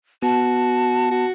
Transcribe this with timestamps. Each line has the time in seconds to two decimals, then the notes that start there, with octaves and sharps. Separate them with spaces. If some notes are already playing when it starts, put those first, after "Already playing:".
0.23 B3 F#4 A5
1.11 F#4